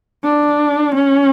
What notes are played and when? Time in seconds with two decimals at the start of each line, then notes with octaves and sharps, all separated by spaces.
0.24 D4
0.95 C#4